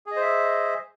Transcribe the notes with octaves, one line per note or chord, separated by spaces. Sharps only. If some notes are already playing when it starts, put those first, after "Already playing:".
G#4 C5 D#5 E5